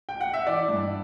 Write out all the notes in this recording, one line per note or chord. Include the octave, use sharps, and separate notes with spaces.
G5
F#5
E5
E3 D5
G2